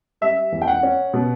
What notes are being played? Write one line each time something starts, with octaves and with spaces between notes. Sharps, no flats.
G3 E5
E2
G5
F#5
C#4
B2